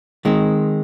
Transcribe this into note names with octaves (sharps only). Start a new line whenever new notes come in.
D#3 G#3 C4